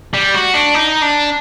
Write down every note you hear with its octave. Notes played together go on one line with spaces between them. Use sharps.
G3
F#4
D4
D#4
D4